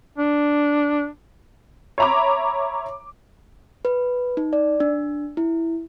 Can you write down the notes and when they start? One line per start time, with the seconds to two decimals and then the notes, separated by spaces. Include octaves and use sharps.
0.18 D4
1.98 C#5 E5 A#5 B5 D6
3.85 B4
4.37 D#4
4.53 D5
4.80 D4
5.37 E4